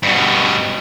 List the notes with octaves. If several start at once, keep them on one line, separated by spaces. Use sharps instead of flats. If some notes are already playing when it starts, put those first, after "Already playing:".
G2 B2